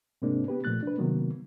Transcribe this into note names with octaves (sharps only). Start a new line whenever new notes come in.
G#2 C3 G#3 A#3 C4 D4
B3 G4 B4
A#2 F3 A3 F#6 A6
D4 B4
C3 D#3 F#3 A#3 B3